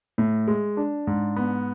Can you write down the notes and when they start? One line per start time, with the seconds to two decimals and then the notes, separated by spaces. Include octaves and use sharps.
0.18 A2
0.48 G#3
0.77 D4
1.07 G#2
1.36 B3